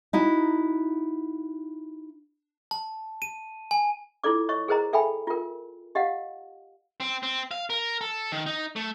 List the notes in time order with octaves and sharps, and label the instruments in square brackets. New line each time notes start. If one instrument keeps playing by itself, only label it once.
[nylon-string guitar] D#4 E4 F#4
[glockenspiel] A5
D#7
G#5
[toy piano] E4 F4 A4 D5 D6
C#5 D#5 C#6
G#4 A#4 C5 D#5 A#5
A4 E5 G5 G#5 B5
F4 A#4
G4 D#5 F5 F#5
[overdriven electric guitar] C4
C4
F5
A#4
A4
D#3
D#4
A3